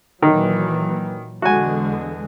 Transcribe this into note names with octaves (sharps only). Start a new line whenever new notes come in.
A#2 D#3 E3 F#3
E2 D3 G#3 F#4 G#5